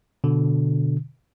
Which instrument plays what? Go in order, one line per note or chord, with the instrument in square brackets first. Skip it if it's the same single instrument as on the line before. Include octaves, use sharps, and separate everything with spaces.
[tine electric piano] B2 D3